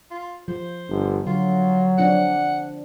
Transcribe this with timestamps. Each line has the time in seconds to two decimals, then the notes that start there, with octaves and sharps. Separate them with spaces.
0.11 F4
0.48 F3 C5
0.88 G1
1.27 D3 F#3 F4
1.98 F3 C4 D4 F#5